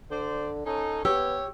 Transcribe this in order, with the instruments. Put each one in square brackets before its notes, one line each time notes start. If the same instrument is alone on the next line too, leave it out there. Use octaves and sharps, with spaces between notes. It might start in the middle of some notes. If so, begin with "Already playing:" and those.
[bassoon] D3 [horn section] C5 D5
[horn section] C#4 D#4 [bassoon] A4
[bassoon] B3 [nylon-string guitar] G4 [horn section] C#5 [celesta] E6